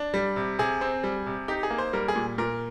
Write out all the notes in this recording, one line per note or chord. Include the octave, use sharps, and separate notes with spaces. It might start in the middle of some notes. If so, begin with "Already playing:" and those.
Already playing: D4
G3
C3
C3 G#4
C4
G3
C3
D#4 G4
G#4
A#3
C5
G3 A#4
G#4
A#2
A#2 A#4